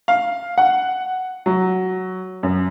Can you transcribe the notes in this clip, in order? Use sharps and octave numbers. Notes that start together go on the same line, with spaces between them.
F5
F#5
F#3
F#2